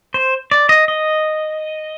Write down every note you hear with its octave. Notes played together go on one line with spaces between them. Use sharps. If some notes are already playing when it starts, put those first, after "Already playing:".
C5
D5
D#5
D#5